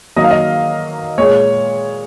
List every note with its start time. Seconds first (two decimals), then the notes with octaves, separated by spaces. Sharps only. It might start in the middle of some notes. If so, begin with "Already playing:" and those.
0.16 D#3 F#3 A#3 D#5
0.24 F5
0.30 D#5
1.18 A#2 G#3 C#5